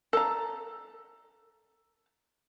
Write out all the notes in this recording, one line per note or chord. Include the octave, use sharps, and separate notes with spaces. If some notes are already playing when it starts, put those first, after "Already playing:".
A4 A#5